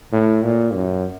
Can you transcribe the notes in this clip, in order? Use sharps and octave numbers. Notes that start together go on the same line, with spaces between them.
A2
A#2
F#2